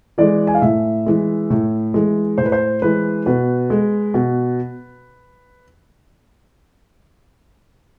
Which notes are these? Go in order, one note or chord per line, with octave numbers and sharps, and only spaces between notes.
E3 G#3 D5
G#5
F5
A2 E5
E3 G#3
A2
E3 G#3
A2 C5
B4
C5
E3 G#3 B4
B2 B4
G#3
B2